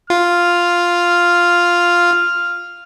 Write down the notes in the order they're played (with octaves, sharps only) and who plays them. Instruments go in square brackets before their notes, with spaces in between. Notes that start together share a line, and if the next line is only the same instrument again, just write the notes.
[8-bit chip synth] F4 [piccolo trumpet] F6